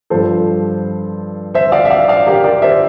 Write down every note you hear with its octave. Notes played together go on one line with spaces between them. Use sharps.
G2 F3 A4 C5
C5 E5
D5 F5
E5
D5 F5
D5 F5
G4 A#4
A#4 D5
C5 E5